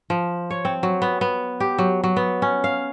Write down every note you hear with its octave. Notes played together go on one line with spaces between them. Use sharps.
F3
C#5
C4
F#3
B3
B3
G4
F#3
F#3
B3
C#4
F5